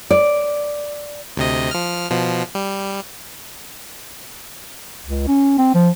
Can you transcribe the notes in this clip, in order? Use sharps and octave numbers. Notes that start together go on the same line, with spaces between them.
D5
D2 C3 D#5
F3 F6
B2 F3
G3
C#2
C#4
C4
F3